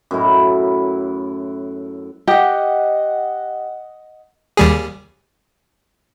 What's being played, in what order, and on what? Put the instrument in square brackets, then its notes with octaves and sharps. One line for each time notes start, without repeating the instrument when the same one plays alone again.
[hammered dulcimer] F#2 A2 E4 A#5
[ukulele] G4 [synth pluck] D#5 F#5
[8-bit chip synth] D#2 G3 G#4